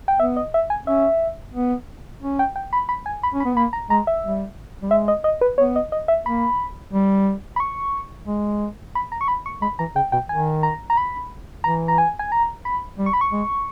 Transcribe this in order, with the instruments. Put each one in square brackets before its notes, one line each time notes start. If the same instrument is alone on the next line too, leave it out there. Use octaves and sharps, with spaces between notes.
[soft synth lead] G5
[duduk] B3 [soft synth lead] E5
[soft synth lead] D#5
E5
G#5
[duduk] C#4 [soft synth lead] E5
[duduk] B3
C#4
[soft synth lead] G5
G5
B5
B5
G#5
B5
[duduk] C#4
[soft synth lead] B5
[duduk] B3
[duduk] A#3 [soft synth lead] B5
[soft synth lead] A#5
[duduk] G#3 [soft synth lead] A#5
[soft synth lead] E5
[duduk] G3
G3
[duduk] G#3 [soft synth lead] E5
[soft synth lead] D#5
D#5
B4
[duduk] B3 [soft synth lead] C#5
[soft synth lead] D#5
D#5
E5
[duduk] A#3 [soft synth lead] B5
[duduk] G3
[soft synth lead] B5
C#6
[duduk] G#3
[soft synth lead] B5
A#5
C#6
B5
C#6
[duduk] G#3 [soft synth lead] B5
[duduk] E3 [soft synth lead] A#5
[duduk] C#3 [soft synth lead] G5
[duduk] B2 [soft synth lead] G5
[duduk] D#3 [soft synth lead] G#5
[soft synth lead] A#5
A#5
B5
[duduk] E3 [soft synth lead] A#5
[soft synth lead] A#5
G#5
G#5
A#5
B5
[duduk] G3
[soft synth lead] C#6
B5
C#6
[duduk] G#3